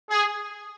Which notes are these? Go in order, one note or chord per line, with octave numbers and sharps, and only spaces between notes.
G#4